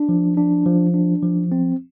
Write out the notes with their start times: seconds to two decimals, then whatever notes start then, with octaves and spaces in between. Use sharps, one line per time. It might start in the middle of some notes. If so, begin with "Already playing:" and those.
Already playing: D4
0.09 F3
0.37 D4
0.66 F3
0.94 D4
1.22 F3
1.52 C4